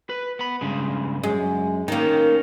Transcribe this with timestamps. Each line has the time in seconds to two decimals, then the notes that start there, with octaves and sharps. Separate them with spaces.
0.09 B4
0.39 B3 B5
0.61 G2 C#3 G#3
1.23 F#2 G#3
1.88 D#3 A#3 C#4 D#4